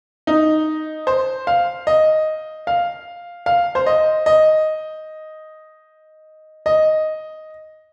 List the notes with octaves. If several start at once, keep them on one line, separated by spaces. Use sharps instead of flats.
D#4
C5
F5
D#5
F5
F5
C5
D#5
D#5
D#5